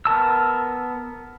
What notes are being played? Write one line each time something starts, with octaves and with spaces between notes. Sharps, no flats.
B3 A#4 A5 E6